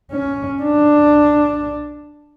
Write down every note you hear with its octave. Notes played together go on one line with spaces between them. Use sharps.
C#4
D4